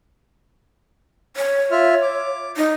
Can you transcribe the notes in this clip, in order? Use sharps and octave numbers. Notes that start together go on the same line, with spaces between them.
C#5
F4 E5 F6
D6
D#4